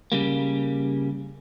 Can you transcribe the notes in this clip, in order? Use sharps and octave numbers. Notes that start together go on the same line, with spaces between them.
C#3 G3 A#3